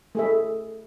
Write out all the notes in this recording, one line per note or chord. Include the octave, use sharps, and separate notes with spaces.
A3 G#4 E5